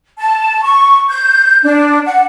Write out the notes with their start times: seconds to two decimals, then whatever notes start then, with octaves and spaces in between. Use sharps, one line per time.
0.19 A5
0.63 C#6
1.08 G6
1.63 D4
2.06 F#5